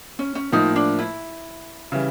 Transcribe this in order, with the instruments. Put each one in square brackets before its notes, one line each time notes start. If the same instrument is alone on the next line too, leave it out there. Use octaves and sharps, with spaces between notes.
[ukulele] C#4
C#4
[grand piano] A2 F3 A#3 [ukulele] D#4
[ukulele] D4
E4
[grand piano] C#3 E3 G3